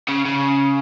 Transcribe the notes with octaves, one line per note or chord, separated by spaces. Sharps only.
C#3
C#3